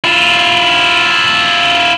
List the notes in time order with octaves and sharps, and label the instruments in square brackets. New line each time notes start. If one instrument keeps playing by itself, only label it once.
[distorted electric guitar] E4 F4